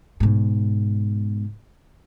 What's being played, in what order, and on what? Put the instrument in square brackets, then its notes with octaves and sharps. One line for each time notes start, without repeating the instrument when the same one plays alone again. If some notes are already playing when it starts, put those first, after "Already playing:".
[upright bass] G#2 B2